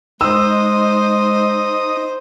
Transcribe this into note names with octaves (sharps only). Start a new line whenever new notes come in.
G#3 D#4 C5 D#6 E6